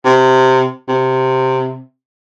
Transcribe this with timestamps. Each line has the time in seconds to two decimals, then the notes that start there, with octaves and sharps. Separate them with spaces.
0.05 C3
0.88 C3